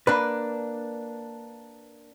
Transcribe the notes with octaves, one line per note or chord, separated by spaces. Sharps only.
A#3 D4 B4